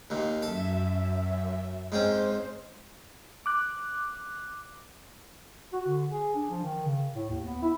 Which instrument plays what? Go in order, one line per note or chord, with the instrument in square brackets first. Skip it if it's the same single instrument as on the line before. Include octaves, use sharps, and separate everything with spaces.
[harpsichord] D#2 A#2
[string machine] F#2 E5 [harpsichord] A4
[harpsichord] G#2 C4 C#4 [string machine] C5
[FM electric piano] D6 F#6
[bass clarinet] F#4
D3
G#4
D4
F3
D#3
C#3
A2
D#2
B3
E4